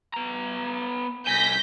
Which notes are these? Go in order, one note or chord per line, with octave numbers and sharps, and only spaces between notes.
B3 A#5
C2 G#5 G6 A#6 B6